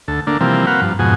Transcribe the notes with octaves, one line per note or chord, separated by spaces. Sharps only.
D2 A4
D3 A3 A#3 D4
C3 E3 F3 G3 A#3 C4
A#3 C4 F#4 B4 F5 F#5
G2 F3
F2 G#2 B2 F#4 G#5